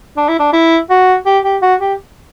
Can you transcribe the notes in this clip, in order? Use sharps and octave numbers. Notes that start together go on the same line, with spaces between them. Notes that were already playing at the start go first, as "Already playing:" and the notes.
D4
E4
D4
E4
F#4
G4
G4
F#4
G4